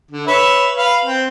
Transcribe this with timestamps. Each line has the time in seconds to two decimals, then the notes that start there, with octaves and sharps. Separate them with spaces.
0.11 D3
0.27 B4 C#5 E5
0.77 B4 F5
1.05 C4